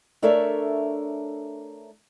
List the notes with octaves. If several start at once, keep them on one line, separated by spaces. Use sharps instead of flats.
A3 D4 A4 A#4 C#5 E5